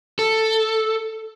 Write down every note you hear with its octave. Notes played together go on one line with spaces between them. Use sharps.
A4